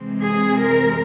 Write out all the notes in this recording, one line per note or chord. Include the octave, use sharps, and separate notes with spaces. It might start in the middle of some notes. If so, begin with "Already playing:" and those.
Already playing: C3 E3 G#3 C4
G#4
A#4